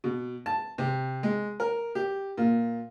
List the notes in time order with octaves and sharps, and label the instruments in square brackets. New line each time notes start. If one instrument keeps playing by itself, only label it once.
[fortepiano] B2
A5
C3
G#3
A#4
G4
A#2